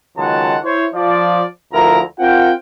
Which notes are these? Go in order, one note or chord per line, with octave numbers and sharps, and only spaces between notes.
C#2 D#3 F#3 G#3 F#5 A5
E4 C5 C#5
F3 D5
D2 F3 E4 A#4 A#5
C4 F4 A#4 F#5 G5